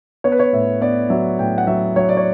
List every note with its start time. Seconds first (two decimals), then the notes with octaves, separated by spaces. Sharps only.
0.24 B3 C#5
0.32 B4
0.39 C#5
0.53 A2 E5
0.81 B3 D5
1.10 F#3 E5
1.39 A2 G5
1.58 F#5
1.67 F#3 E5
1.96 F#3 C#5
2.09 D5
2.17 C#5